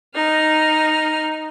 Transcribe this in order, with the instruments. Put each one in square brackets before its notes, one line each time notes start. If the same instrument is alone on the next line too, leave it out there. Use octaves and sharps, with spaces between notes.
[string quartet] D#4 F6